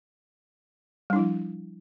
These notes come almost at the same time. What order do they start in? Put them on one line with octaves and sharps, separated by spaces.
G3 D4 E4 F3